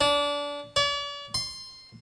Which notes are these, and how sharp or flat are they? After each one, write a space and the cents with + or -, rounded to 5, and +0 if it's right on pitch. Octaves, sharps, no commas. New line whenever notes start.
D4 -25
D5 -45
C6 +0